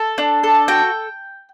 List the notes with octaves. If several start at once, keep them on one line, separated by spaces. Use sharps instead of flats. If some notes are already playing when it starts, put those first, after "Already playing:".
Already playing: A4
D4
A4
F#4 G5